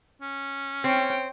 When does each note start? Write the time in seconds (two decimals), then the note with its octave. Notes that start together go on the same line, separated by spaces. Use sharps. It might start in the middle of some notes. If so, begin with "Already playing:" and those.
0.22 C#4
0.84 C4 C#5 G5